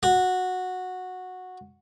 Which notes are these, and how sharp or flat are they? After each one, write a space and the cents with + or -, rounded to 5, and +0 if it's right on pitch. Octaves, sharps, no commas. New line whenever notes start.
F#4 -10